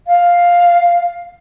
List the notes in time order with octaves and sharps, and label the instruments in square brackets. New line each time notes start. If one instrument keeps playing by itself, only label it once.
[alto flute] F5